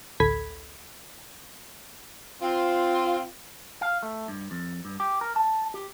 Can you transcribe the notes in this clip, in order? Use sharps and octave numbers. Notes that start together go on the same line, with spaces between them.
A1 D2 A4 B5 G#6 B6
C4 F4
F5
A3
G2
F2
G2
G4
A#4
A5
G4